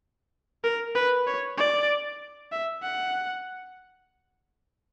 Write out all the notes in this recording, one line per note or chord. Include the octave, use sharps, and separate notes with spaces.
A#4
B4
C#5
D5
E5
F#5